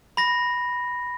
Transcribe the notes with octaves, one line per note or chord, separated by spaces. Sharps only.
B5 A#6